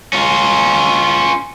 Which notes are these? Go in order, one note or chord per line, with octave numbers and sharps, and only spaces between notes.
C#4 F4